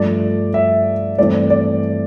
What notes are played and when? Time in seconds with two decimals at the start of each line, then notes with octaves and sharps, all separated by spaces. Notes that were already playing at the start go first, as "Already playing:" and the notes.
Already playing: G2 F3 A3 D5
0.54 E5
1.18 G2 E3 A3 C4 D5
1.50 D5